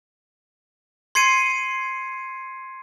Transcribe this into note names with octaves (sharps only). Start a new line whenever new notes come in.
C6 G#6 C7 C#7 D#7